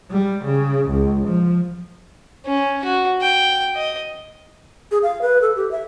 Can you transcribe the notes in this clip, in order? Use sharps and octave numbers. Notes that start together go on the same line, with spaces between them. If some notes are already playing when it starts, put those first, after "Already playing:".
G3
C#3
C#2
F3
C#4
F#4
G5
D#5
G#4
F5
B4
A4
G4
E5